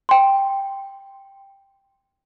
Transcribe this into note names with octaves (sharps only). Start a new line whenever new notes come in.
G5 C6